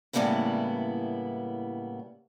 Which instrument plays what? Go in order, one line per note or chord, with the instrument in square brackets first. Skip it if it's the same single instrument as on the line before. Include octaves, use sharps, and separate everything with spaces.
[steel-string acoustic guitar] A2 C#3 G3 A#3 B3 E4